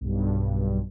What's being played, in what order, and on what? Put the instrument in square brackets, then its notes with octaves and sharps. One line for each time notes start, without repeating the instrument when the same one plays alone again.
[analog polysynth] B1 G2